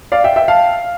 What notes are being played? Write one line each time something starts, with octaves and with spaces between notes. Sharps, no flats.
D5 F5
E5 G5
E5 G5
F5 A5